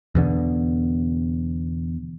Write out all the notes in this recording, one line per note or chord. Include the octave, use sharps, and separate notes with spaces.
E2 B2 D3